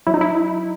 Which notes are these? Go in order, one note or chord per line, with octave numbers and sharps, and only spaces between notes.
F#3 E4
D#4
E4